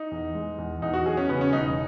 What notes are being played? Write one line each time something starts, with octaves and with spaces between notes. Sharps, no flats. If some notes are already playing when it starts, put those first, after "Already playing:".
Already playing: D#4
E2
G#3
E2
E2 D#4
F#4
F#3 G#4
C#4
C#3 B3
C#4
E1 D#4